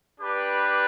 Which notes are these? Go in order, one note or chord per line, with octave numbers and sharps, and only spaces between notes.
D4 G4 B4